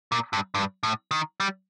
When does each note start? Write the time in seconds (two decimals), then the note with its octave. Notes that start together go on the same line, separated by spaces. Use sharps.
0.12 A#2
0.33 G2
0.55 G2
0.83 A2
1.11 D#3
1.40 G3